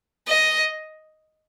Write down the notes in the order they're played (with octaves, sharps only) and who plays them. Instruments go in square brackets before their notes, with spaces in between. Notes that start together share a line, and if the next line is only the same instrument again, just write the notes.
[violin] D#5